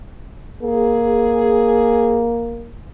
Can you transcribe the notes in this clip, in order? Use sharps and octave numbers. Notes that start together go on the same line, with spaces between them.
A#3 G#4